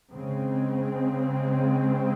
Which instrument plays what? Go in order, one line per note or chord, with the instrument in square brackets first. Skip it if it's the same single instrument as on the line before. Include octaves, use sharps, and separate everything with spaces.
[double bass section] C#3 G#3 C4